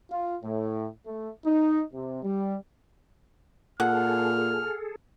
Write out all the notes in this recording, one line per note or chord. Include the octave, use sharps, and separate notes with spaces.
F4
A2
A3
D#4
C3
G3
A#2 G#4 A4 F#5 F6